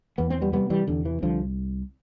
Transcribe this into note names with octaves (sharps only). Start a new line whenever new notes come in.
E2 B3
C4
G3 B3
C3 G3 B3
E3 G3
E2 D3
E3
C2 D3 F3